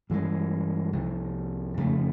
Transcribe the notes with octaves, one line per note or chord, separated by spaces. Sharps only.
G2 E3 G#3
C2 C3 F3
F2 C#3 F3 A3